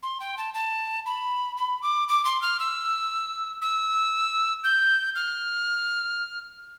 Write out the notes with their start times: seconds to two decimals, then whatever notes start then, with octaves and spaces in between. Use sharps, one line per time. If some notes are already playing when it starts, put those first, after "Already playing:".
0.03 C6
0.20 G5
0.38 A5
0.54 A5
1.06 B5
1.57 B5
1.82 D6
2.08 D6
2.25 C6
2.42 F6
2.59 E6
3.62 E6
4.64 G6
5.15 F6